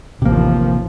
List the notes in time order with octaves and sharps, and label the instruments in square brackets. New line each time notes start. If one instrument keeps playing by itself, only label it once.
[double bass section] A1 D#2 F3 [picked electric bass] C3 A#3